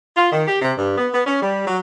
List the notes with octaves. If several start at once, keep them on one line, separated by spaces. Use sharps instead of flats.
F4
D#3
G4
C3
G2
B3
B3
C#4
G3
F#3